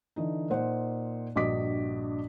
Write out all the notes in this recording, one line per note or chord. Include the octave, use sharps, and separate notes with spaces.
D3 E3 D#4
A#2 D#4 C5 F#5
A#1 G2 F#4 D#5 D6 B6